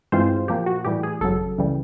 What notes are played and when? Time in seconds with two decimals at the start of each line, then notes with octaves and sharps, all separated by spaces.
0.12 G2 E3 G#3 C4 F4 C5
0.48 A#2 F3 A#3 G4
0.66 F#4
0.85 A2 E3 G3 G4
1.03 G#4
1.21 G#1 F#2 C#3 F#3 A4
1.58 C#2 C#3 E3 G3